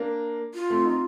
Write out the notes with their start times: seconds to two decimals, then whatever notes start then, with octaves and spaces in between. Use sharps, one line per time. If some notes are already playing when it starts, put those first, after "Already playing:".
Already playing: A#3 D4
0.54 F4
0.70 A3 C4
0.85 C4 D#4